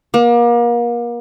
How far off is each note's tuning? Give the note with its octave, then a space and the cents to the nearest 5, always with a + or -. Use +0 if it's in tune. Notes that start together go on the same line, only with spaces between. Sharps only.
A#3 +35